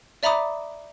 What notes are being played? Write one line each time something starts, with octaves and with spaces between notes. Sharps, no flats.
D5 E5 A#5 B5 D6 D#6